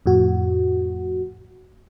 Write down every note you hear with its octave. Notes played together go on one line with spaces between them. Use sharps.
F2 A2 F#4